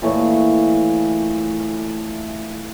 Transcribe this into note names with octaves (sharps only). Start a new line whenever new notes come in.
A#2 E3 A3 C#5